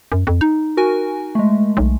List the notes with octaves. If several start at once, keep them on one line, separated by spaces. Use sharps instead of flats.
F#2
F2
D#4
F#4 A#4 G#5
G#3 A3
B1